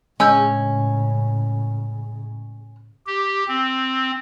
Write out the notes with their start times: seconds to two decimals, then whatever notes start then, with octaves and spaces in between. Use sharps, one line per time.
0.20 A2 C#3 G#3 C#4 G#5 E6 G6
3.07 G4
3.48 C4